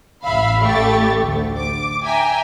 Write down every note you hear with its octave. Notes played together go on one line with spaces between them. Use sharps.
A1 E5 F5 B5
A1 A3 G4 C#6 A6
D2
D6
E5 G5 G#5 A#5